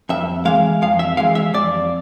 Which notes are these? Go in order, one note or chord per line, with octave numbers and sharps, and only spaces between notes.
F2 E5
E3 G#3 F5
F2 F5
E5
E3 G#3 F5
E5
F2 D5